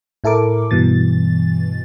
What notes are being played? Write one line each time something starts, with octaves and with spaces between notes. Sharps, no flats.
A2 E4 A4 A#4 D6
G2 B2 E3 A6